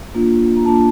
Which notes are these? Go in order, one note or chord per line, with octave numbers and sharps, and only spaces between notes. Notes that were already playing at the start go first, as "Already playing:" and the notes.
A#3 D4 F4
A#5
A#3 D4 F4 A5